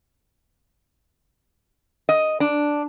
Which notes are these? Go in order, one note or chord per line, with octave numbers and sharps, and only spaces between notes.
D#5
D4